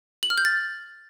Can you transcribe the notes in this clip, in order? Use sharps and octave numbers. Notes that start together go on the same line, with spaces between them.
F#7
F6
G6
A6